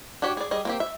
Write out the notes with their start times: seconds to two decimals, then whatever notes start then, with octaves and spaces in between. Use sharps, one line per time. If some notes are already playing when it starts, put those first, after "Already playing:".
0.22 D4 F#4 G4 C#5
0.37 G#4 D5
0.51 G3 G#4 D#5
0.65 A#3 C4 G4
0.80 E5